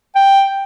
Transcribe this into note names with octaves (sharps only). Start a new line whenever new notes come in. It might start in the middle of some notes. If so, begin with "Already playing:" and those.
G5